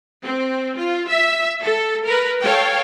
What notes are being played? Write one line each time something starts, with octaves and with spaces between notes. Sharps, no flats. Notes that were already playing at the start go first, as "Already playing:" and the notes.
C4
F4
E5
A4
A#4 B4
A4 C#5 F5 G5